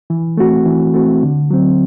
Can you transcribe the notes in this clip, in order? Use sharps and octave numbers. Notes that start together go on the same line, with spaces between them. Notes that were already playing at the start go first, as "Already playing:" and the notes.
E3
A3 C4 F#4
E3
A3 C4 F#4
D3
F#3 C4